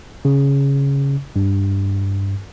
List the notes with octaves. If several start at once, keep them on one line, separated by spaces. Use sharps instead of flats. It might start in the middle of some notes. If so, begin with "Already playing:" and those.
C#3
G2